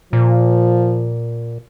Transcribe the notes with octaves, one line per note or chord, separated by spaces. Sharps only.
A#2 F3